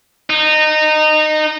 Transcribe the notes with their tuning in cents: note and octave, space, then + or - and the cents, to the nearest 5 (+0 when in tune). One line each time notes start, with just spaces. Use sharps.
D#4 -20